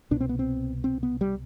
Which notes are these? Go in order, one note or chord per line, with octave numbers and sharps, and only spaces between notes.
C2 B2 D4
C4
B3
C4
C4
B3
G3